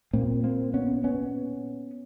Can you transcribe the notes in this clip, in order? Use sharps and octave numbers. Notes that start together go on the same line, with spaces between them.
A#2 A#3 C4
A#3 C4
B3 C#4
B3 C#4